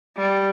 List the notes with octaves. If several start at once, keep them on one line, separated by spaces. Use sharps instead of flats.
G3